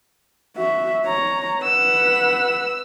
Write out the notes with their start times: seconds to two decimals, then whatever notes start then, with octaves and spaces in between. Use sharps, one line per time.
0.57 F#4 E5
1.05 C#5 A#5
1.62 B4 F#5 E6